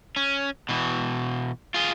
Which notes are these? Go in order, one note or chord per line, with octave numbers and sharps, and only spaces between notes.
C#4
B2 E3
F4 G#4